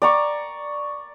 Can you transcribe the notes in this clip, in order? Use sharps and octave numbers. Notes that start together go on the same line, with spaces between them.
D5 A#5 C#6